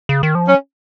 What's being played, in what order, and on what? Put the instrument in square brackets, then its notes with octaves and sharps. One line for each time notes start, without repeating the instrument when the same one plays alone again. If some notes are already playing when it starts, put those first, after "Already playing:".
[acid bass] C#3
D#3
F3
[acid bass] F#3 [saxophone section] C#4